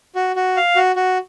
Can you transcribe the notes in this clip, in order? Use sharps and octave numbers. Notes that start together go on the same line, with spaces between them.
F#4
F#4
F5
F#4
F#4